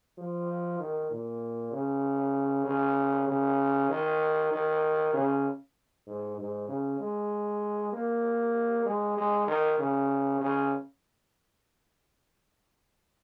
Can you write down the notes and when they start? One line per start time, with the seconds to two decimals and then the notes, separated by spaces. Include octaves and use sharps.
0.17 F3
0.79 D#3
1.10 A#2
1.72 C#3
2.66 C#3
3.28 C#3
3.90 D#3
4.51 D#3
5.13 C#3
6.06 G#2
6.38 G#2
6.68 C#3
7.00 G#3
7.93 A#3
8.86 G#3
9.17 G#3
9.47 D#3
9.79 C#3
10.40 C#3